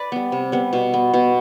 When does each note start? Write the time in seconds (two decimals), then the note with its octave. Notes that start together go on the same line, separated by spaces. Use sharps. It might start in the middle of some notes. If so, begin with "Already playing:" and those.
Already playing: B4 D5
0.12 G3 B3
0.32 C3
0.52 G3 B3
0.73 B2
0.94 B3
1.14 B2